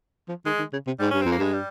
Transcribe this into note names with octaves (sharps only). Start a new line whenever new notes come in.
F3
D#3 G#3
D#3
C#3
C3
G#2 G3
G2 C#4
F2 C4
A#3
G2 G#3
G3